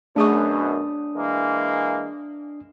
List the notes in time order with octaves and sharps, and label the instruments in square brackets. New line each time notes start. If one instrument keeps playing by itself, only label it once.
[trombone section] F#2 B2 [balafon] A3 G#4 C#6 [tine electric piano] D4 D#6
[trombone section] E3 G#3 A#3